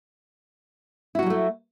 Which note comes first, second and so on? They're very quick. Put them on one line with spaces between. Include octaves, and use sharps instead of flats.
E4 F#4 F#3 G3 A3